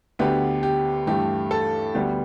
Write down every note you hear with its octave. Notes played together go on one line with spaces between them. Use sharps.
D2 D3 B3 G4 B4
G4
G2 E3 A3 G4
A4
D2 D3 G3 B3 G4